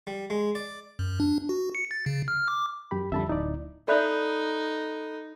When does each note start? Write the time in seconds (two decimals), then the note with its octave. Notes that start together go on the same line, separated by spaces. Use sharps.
0.07 G3
0.30 G#3
0.55 D5
0.99 F#2
1.20 D4
1.49 F#4
1.75 C#7
1.91 A6
2.06 C#3
2.28 F6
2.48 D6
2.91 F#2 G4 B5
3.12 F2 D3 G3 E5 A5 B5
3.29 D1 D#4 E4 D5
3.88 D#4 A4 D5 E5 B5 F#6 G6